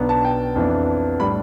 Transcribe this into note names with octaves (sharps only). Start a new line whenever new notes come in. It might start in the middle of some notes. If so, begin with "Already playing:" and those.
Already playing: B1 B2 B3 D4
A5
G5
F2 E3 B3 D4
A2 G3 D4 B5